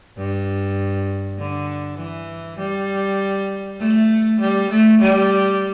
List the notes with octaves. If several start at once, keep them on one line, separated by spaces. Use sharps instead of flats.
G2
D3
E3
G3
A3
G3
A3
G3